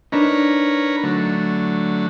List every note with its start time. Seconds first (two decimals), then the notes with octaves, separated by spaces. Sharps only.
0.12 D4 D#4 A#4 B4 C#5
1.04 D3 F#3 A3